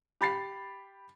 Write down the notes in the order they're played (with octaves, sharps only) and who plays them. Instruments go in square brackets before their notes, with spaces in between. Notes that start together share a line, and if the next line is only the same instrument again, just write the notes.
[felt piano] G4 B5 A6 C7